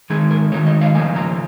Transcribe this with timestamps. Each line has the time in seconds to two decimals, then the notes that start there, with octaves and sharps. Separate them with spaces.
0.10 D#3 G#3 D#4 G#4
0.31 A#4
0.52 D#3 G#3 D#4 C#5
0.67 D#5
0.81 F5
0.95 C#3 F3 A#3 G#5
1.16 A#5